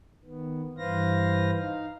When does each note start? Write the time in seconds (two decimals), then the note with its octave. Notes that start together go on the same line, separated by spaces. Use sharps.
0.25 D#3 B3
0.78 G2 E3 B4 C5 F5 A#6
1.57 D#4 F5